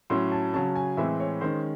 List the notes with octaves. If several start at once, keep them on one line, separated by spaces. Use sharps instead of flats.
A2 F#3 C#4 C6
A5
C#3 F#3 C#4 A5
G#5
A2 E3 G#3 C4 E5
C#5
D#3 G#3 C#4 C5